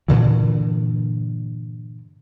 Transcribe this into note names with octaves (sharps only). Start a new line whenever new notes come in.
G2 A#2 D3 E3